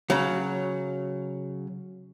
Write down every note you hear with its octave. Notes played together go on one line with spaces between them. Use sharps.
C#3 F#3